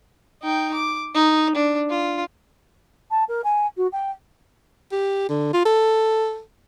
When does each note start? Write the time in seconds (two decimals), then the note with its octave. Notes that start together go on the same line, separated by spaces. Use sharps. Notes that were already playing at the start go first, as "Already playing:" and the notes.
0.42 D#4 G5
0.74 D6
1.15 D#4
1.55 D4
1.90 F4
3.11 A5
3.29 A#4
3.44 G#5
3.77 F#4
3.92 G5
4.92 G4
5.29 D3
5.53 F4
5.65 A4